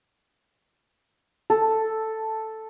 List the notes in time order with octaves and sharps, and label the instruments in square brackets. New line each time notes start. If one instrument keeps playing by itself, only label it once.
[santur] A4